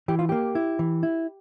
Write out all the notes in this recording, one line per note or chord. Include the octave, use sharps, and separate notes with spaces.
E3 G4
F4
A#3 G4
E4
E3
E4